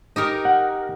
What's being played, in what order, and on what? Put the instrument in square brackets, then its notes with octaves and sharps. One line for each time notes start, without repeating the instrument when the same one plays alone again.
[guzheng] D#4 G4 A#4
[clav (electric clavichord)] F#5